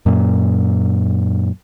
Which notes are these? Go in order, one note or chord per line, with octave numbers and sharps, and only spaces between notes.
F#2 A#2